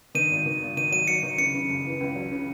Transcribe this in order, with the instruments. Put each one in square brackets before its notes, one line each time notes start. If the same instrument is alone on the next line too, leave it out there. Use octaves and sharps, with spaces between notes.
[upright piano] D#3 [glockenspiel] D#7
[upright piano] G#1
D#3
G#1
[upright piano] D#3 [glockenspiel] D#7
[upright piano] F#3 [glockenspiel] D#7
[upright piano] F#3 [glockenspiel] C#7
[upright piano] D#3
[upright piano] C#3 [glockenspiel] C#7
[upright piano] C#3
F#1
E3
C#2
F#3
C#3